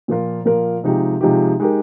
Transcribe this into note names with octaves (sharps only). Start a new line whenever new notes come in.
A#2 F3 A#3 F4 A#4
A#2 F3 A#3 F4 A#4
C3 F3 G#3 D#4 G4
C3 F3 G#3 D#4 G4
G#3 D#4 G4 A#4